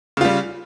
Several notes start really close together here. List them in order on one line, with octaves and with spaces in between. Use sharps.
C#3 F4 G3